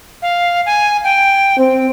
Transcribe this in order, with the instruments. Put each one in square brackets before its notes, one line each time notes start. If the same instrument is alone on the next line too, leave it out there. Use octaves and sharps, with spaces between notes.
[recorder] F5
G#5
G5
[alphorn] C4